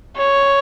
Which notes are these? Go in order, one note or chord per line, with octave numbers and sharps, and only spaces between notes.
C#5